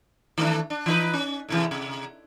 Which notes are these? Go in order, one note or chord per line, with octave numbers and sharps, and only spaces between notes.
D#3 A3 D4
D4
E3 D#4 B4
C#4
A2 C3 E3
C3